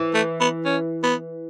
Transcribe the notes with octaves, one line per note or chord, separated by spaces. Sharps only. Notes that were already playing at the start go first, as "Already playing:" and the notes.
Already playing: E3
A3
B3
C#4
B3